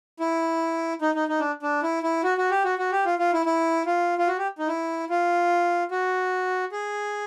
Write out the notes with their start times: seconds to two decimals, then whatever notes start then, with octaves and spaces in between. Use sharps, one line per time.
0.20 E4
1.02 D#4
1.15 D#4
1.28 D#4
1.40 D4
1.63 D4
1.83 E4
2.03 E4
2.24 F#4
2.38 F#4
2.51 G4
2.64 F#4
2.79 F#4
2.92 G4
3.05 F4
3.19 F4
3.33 E4
3.46 E4
3.86 F4
4.18 F4
4.28 F#4
4.38 G4
4.59 D#4
4.68 E4
5.10 F4
5.91 F#4
6.72 G#4